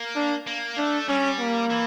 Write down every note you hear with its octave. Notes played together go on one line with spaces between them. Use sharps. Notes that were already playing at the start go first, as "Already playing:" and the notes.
Already playing: A#3
D4
A#3
A3 D4
G3 C#4
A#3
E3